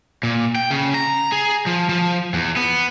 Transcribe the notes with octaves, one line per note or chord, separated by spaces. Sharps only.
A#2
G5
C#3
A#5
G#4
F3
F3
E2
B3